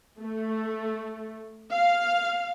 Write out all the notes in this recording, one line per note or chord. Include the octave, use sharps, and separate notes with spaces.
A3
F5